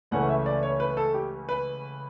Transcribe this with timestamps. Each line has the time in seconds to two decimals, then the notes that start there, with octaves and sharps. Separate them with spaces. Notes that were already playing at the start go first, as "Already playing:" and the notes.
0.11 C#2 C#3 E3 A3 C#4 F#5
0.29 E5
0.46 D5
0.63 C#5
0.80 B4
0.97 A4
1.14 G4
1.49 B4